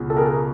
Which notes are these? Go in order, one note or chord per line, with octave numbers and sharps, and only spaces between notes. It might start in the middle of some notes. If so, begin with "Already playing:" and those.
Already playing: C#2 B2
A4
G#4 A#4